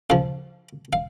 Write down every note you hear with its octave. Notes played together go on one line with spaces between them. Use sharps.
C#3 F3 F5
F5